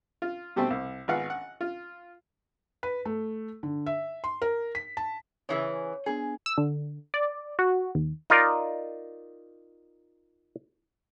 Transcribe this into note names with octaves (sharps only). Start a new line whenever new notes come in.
F4
B2 G3 A3 C4
C2
G#1 B3 F4 F5 F#5
F#5
F4
B4
A3
D3
E5
C6
A#4
B6
A5
C#3 E3 G#4 C#5
B3 D4 G#4 G#5
E6
D3
D5
F#4
D#2
D#4 F4 A#4 D5 D#5